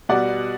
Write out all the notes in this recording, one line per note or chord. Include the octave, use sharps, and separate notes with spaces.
B2 G3 D5 F#5